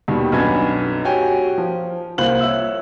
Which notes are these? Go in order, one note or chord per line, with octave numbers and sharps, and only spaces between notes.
D#2 B2 D#3 G3
B1 F#2 B3 D4 G#5 G#6
F#4 G4 C#5 G5 G#5
F3
C2 A#3 F4 C5 F#6 F#7
C#5 E5 E6